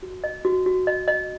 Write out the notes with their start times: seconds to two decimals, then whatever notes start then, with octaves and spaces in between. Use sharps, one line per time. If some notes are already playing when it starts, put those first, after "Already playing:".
0.03 F#4
0.24 D#5
0.45 F#4
0.66 F#4
0.87 D#5
1.08 D#5